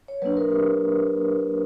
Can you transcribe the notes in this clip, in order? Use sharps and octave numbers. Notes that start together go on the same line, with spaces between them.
C#5
F#3 A#3 D4 B4
A#4
G4